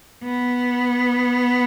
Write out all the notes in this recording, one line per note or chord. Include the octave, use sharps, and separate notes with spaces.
B3